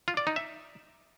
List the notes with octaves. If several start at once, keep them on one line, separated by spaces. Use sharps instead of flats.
F4
D5
D#4
E5